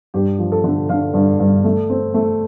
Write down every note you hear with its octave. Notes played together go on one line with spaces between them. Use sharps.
G2 G4
F3
A4
D3
D3 F5
G2
G2
A3
C4
A3